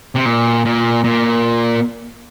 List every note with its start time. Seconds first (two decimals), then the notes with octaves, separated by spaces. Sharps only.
0.15 C3
0.25 A#2
0.65 A#2
1.04 A#2